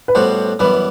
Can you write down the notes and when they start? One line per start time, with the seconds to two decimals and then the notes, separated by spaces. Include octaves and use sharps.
0.08 B4
0.15 A2 G3 B3 F#4 C5
0.59 F#2 E3 G3 B3 B4